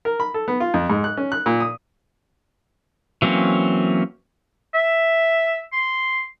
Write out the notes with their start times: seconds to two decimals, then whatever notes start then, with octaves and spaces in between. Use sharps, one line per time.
0.05 A#4
0.20 B5
0.34 A4
0.48 B3
0.60 F4
0.74 F2
0.90 G#2
1.04 F#6
1.17 C#4
1.32 F#6
1.46 A#2
1.60 D#6
3.22 E3 F#3 A#3 C4 C#4
4.74 E5
5.72 C6